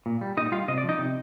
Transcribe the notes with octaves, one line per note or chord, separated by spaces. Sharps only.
A#2
G3
A#2 D#4 D#5
G3 F4 F5
C3 D#5
D5
F3
D#4 D#5
C3